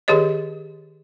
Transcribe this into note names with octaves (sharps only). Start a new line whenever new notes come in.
D#3 G4 G#4 C#5 D#5